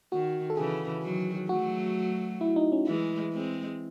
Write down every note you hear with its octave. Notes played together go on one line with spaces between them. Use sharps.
D#3 F#4
A4
C#3 E3 G#4
D#3 F#3
F#3 A3 F#4
E4
D#4
C#4
E3 G#3 E4
G#3 C4